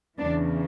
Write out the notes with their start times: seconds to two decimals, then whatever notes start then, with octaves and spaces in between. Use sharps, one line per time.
0.19 E2 C#3 E3 B3 D4